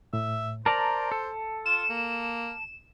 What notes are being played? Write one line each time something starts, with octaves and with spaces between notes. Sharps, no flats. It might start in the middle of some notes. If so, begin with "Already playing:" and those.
A2 E5
A#4 C5 D5 A5 A#5
A4
F4 E7
A#3